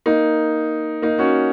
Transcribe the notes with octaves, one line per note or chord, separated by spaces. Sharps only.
A#3 D#4
A#3 D#4
C#4 F#4